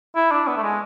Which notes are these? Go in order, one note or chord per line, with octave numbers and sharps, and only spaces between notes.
E4
D4
B3
A3
G#3